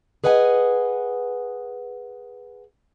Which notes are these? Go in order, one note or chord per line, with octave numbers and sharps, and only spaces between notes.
G#4 B4 D#5 F#5 G#5